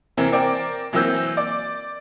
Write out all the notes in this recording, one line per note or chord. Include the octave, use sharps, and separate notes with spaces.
C3 E3 C4 A#4
C4 A#4 D5 G5
E3 F#3 A#3 C4 E6 G6
D5